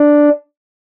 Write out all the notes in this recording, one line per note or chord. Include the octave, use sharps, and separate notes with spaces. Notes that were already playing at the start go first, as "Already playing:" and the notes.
Already playing: D4